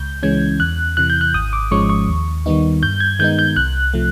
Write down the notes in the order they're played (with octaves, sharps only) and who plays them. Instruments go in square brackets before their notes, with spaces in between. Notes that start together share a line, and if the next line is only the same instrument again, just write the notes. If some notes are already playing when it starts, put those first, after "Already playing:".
Already playing: [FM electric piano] C#2 G6
C#3 E3 G#3 C#4 G#6
E2 F#6
C3 E3 F#6
G6
F#6
G#1 D#6
D6
G#2 F3 G#3 C#4 C#6
C#6
D#2
D#3 G3 B3 D#4
G2 G6
G#6
D#3 G#3 B3 D#4 G6
G6
C2 F#6
C3 F3 A3